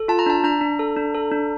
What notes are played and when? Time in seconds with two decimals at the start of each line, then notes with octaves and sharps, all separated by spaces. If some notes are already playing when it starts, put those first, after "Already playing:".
Already playing: A4
0.08 F4 A5
0.19 A#5
0.26 D4 A5
0.44 D4 A#5
0.61 D4
0.79 A4
0.97 D4
1.15 A4
1.32 D4